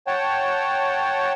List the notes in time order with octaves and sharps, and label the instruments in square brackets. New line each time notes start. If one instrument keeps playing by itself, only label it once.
[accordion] C#5 F#5 G5 A5